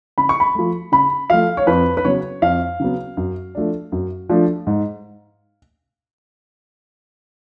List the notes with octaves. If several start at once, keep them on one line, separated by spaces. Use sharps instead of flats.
C#3 B5
C#6
B5
F3 A3
C#3 B5
F3 A3 F5
C#5
F2 B4
B4
C#3 F#3 B3 C#5
F2 F5
C#3 F#3 B3
F#2
F3 A3 D4
F#2
F3 A3 D4
G#2